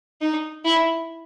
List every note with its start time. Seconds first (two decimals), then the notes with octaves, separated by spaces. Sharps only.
0.21 D#4
0.65 E4